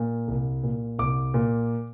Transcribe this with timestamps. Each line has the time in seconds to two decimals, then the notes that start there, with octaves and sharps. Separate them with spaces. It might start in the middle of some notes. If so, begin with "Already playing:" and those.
Already playing: A#2
0.28 C2
0.63 A#2
0.99 C2 D6
1.34 A#2